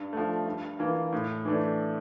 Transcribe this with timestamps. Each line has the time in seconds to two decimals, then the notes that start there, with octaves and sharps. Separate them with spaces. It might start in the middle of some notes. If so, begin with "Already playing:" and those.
Already playing: G2
0.13 F3 A3
0.46 G2
0.79 E3 A#3 F4
1.12 A2
1.45 E3 A3 D4